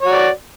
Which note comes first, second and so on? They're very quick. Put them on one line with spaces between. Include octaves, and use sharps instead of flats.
C#5 F#4 D5